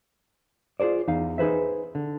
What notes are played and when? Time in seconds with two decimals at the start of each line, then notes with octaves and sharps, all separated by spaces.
0.80 F4 G#4 A#4 C5 D5
1.08 E2 D#4 F5
1.38 D#4 G#4 B4 C5 E5
1.95 D3